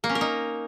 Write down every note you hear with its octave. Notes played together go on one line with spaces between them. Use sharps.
A#3
C#4
A#4
D#4